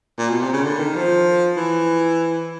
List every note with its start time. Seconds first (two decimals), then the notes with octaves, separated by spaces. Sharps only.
0.18 A#2
0.30 B2
0.41 C3
0.53 C#3
0.64 D3
0.79 D#3
0.96 F3
1.57 E3